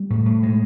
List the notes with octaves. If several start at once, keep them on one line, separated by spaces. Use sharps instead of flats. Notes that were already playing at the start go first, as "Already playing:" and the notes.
Already playing: G3
A2
A2
B2 G#3